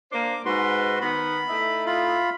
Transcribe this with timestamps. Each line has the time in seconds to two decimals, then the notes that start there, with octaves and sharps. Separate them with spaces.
0.12 A#3 D4 C5 D6
0.45 G#2 F#4 B4 C6
1.01 D#3 B3 B5
1.49 A3 D#4 E4
1.86 F4 B5